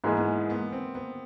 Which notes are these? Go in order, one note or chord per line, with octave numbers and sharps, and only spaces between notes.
G#2 E3 G#3 A#3
B3
A#3
B3
C4
B3